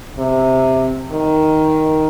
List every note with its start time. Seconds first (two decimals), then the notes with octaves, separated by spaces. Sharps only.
0.19 C3
1.12 D#3